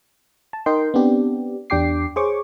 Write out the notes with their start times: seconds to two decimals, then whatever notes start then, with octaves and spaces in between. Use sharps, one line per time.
0.53 A5
0.66 D#4 A#4 D#5 G5 C6
0.94 B3 C4 D4 G4
1.70 E2 D4 G4 G5 D6 C7
2.16 G#4 C5 C#5 C#6 D6